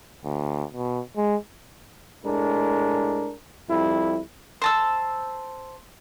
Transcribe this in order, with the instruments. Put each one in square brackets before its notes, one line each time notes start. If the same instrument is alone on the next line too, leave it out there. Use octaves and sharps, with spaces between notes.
[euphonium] D2
B2
G#3
[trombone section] A2 G#3 D4 A#4
F2 G3 E4
[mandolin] C5 A5 E6